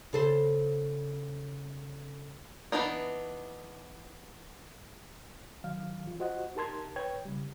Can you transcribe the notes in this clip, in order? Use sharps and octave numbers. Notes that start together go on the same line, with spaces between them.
C#3 A4 C5
E3 A#3 B3 D4 D#4
D#3 F#3 F5
E3 F4
F4 F#4 C5 D#5 F#5
D#4 G4 A#4 A5 C6 G#6
B4 C#5 G5 G#6
C#3 G3